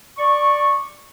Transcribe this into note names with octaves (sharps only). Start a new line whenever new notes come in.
D5 C#6